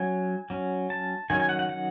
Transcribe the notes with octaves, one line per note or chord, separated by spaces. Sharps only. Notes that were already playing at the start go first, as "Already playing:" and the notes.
Already playing: F#3 C#4 G#5
F#3 C#4
A5
D#3 F#3 C#4 G#5
G#5
F#5
F#5
F#5